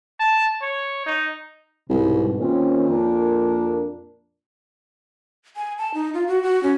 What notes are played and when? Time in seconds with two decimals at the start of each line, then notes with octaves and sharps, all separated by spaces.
0.20 A5
0.62 C#5
1.06 D#4
1.90 C2 G#2 B2
2.40 A#2 D#3 C4 C#4
2.89 F2 D4 A#4
5.56 G#5
5.78 A5
5.94 D#4
6.14 F4
6.27 F#4
6.43 F#4
6.63 C#4